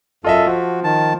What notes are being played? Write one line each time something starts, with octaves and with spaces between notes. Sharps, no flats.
F#2 F4 A4 D#5 E5
F3 F#4
D#3 A5